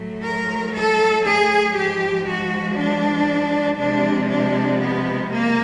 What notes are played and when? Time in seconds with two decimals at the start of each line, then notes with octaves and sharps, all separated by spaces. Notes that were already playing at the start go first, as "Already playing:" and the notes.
Already playing: A2 F#3 A3
0.22 A#4
0.73 A4
1.25 G#4
1.74 G#2 F3 G#3 G4
2.26 F#4
2.77 D4
3.78 C3 F3 G#3 D4
4.29 D4
4.79 B3
5.31 A#3